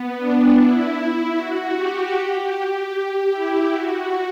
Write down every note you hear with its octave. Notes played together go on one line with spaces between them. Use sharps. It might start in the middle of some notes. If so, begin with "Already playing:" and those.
Already playing: B3
D4
E4
F#4
G4
G4
G4
E4
F#4